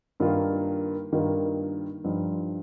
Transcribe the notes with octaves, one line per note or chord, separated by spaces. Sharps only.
G2 D#3 A#3 F4
G2 D#3 A#3 F4
G2 F3 D#4